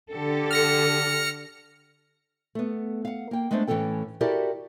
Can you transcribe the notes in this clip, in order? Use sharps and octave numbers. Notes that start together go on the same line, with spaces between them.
D3 G4 A4
F6 A#6 C#7
A3 B3
F5 F#5
A#3 G5
G#3 A3 B3 D4 C5
A2 E3 F#3 C#4 A4 G5
E4 F#4 G4 A4 A#4 D5